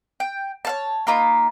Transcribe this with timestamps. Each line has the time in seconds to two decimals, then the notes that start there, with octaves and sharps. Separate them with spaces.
0.20 G5
0.65 C#5 F5 A5
1.07 A#3 D#4 F4 B5